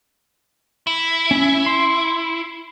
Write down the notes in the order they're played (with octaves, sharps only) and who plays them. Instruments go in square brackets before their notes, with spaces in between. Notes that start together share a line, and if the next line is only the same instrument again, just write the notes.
[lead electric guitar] E4
[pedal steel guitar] C#4 E5
C6